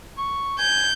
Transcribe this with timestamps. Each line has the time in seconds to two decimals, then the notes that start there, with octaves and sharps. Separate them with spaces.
0.17 C#6
0.59 G#5 G6